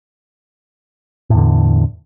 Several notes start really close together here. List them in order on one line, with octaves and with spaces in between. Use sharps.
A2 E2 D3